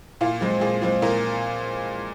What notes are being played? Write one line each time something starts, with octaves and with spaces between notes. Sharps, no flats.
A#2 F4
F3 G#3 C4
A#2 G#4
F3 G#3 C4
A#2 A#4